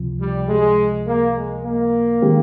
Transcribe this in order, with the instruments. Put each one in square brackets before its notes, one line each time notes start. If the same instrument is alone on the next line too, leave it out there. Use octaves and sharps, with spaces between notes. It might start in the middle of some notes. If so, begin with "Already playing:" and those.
Already playing: [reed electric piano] C#2 C3 F3
[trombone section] G3
G#3
A#3
G#3
A#3
[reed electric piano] D#3 G#3 C4 G4